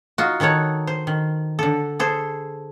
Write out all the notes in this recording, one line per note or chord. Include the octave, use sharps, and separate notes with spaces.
D#4 F4 F#4
D#3 D#4 A4 C#5 F#5
C5
D#3
D3 A4
G#4 A4 C5